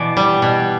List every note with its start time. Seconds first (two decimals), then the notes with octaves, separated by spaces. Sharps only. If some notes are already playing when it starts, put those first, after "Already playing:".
Already playing: B2 E3 D5
0.17 G3
0.42 B2